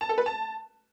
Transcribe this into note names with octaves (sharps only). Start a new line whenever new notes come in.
A5
A4
B4
A5